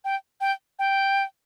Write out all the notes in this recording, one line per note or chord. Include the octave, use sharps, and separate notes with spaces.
G5
G5
G5